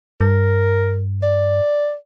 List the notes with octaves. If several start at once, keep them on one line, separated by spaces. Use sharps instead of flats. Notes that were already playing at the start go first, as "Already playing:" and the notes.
G2 A#4
D5